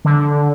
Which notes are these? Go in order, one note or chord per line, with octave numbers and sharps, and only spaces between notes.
D3